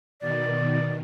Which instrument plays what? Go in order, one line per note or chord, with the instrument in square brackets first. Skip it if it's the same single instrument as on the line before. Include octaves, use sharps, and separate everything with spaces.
[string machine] B2 D#3 [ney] D5